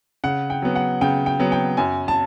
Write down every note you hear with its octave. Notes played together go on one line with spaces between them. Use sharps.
C#3 F#5
G5
F#3 B3
F#5
C#3 G5
G5
F#3 B3
G5
F#2 G#5
A5